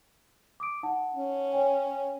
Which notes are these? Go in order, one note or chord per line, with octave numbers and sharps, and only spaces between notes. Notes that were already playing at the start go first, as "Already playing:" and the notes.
D6 D#6 D7
D#4 F#5 A5
C#4
C#5 G5 G#5